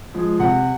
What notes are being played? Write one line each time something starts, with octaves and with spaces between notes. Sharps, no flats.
F3 G#3
C3 F#5